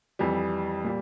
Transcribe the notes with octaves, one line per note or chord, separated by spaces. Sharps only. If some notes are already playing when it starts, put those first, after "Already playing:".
F2 E3 G3
A#2 G3 A#3